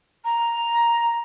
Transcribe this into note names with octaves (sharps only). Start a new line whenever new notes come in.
A#5